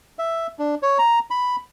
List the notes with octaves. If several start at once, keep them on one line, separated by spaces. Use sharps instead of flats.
E5
D4
C#5
A#5
B5